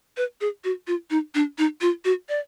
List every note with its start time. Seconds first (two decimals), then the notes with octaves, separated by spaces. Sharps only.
0.17 B4
0.41 G#4
0.64 F#4
0.87 F4
1.10 D#4
1.35 D4
1.58 D#4
1.81 F4
2.05 F#4
2.29 D5